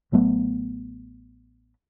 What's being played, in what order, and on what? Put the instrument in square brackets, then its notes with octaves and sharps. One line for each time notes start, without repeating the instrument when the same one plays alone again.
[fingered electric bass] A1 F#3 A3 B3